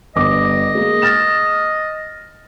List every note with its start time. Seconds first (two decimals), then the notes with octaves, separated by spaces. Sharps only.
0.16 G1 D#5 D6
0.75 G#3 A#3
1.02 F6 A6 E7